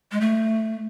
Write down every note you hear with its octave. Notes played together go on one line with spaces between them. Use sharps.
G#3
A3